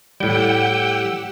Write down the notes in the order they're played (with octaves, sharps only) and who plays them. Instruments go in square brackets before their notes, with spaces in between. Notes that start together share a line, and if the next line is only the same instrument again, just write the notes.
[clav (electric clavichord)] A2 G3 [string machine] G4 F#5 E6 [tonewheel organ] G5